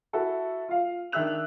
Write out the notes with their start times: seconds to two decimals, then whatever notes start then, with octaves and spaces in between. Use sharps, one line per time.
0.13 E4 F#4 A4
0.68 F4 F5
1.12 D#3 D4 E5 E6 F#6 F7